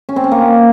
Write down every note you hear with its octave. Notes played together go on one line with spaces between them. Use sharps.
C#4
C4
C#4
A#3